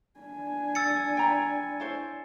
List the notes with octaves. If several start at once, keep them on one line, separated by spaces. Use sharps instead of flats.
D4 G#5
E6 A6 C#7
G5 A#5 B5
E4 C5 C#5